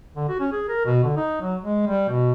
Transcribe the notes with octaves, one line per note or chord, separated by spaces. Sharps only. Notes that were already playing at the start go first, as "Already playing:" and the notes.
D3
F#4
C#4
G#4
A#4
B2
D3
D#4
F#3
G#3
G3
B2